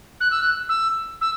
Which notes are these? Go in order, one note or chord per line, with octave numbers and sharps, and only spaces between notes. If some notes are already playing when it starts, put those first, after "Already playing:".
F#6
E6
F#6
E6
E6